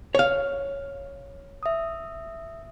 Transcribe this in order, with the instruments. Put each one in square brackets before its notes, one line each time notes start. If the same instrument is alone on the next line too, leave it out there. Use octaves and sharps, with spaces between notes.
[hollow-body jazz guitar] C#5 F5
[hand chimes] E5 D#6